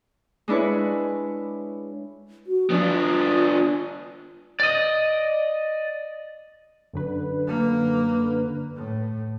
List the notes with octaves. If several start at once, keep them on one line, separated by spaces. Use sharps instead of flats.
G#3 D4 E4 B4 C#5
F#4
F3 B3 D4
F4
D5 D#5
F#2 D3 B4
A#3
A2